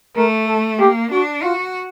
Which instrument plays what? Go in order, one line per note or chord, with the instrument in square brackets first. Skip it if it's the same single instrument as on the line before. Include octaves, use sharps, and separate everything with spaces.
[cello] A3 [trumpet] A#4
[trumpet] A4
[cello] A#3 [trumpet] G4
[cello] D4 [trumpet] F#4
[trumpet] F4 [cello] F#4